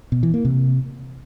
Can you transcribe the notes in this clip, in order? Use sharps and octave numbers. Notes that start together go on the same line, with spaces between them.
B2
E3
A#3
C3